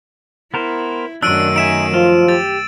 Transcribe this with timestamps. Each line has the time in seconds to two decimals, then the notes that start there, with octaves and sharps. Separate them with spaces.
0.54 B3 E4 A#4 C5
1.22 F#2 D#3 A3 D4 E6 F#6 D7 D#7
1.56 D#4 E5 G#5 D7 E7
1.94 F3 F4
2.28 G4 A6